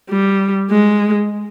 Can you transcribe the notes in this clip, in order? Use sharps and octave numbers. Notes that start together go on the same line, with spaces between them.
G3
G#3